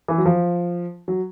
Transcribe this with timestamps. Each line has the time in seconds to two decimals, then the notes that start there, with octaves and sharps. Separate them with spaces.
0.08 E3
0.18 F#3
0.26 F3
1.08 F#3